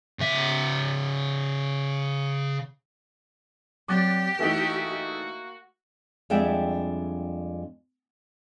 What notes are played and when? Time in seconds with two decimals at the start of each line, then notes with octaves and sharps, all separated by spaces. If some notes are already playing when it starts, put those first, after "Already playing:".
0.19 C#3 E5
3.88 F#3 C4 G4 D5 D6 F#6 A6
4.39 E3 A3 A#3 D#4 F#4 D#5 E5
6.30 F2 G3 G#3 D4 E5 G5